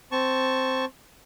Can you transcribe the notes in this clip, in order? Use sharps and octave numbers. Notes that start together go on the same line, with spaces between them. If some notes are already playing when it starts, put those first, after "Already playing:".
C4 A5 C#6